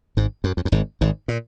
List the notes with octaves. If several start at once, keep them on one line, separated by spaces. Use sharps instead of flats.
G#1 G#2
F#2
F2
F#2
G#1 G#2
G#1 G#2
A#2